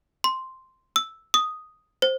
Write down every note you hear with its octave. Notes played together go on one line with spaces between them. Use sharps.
C6
E6
D#6
C5